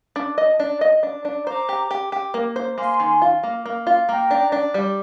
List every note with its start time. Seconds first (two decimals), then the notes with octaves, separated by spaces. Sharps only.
0.16 D4
0.38 D#5
0.59 D4
0.81 D#5
1.03 D4
1.25 D4
1.47 C5 A#5 D6
1.69 G4
1.91 G4
2.12 G4
2.34 A#3
2.56 C5
2.78 A#3 G#5 C6
3.00 D#3
3.22 F4
3.43 A#3
3.66 A#3
3.87 F4
4.09 A#3 G5 A#5
4.31 D4
4.52 D4
4.74 G3